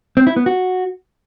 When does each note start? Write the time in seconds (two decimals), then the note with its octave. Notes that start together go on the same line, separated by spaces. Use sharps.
0.17 C4
0.27 E4
0.36 B3
0.46 F#4